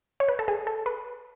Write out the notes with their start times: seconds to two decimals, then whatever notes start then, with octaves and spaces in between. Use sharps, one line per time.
0.20 C#5
0.28 B4
0.39 A4
0.48 G#4
0.67 A4
0.86 B4